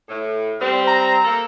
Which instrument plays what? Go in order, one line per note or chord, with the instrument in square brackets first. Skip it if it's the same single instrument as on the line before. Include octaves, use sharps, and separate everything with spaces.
[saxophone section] A2
G3 C4
[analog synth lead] A#5
[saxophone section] A#3 A4